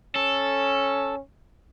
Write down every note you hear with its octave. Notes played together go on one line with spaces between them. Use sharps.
C#4 A4